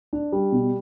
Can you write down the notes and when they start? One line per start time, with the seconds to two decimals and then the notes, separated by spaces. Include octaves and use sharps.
0.13 D4
0.32 G3
0.52 B2